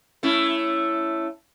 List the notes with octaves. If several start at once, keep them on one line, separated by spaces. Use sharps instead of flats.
A3 C#4 E4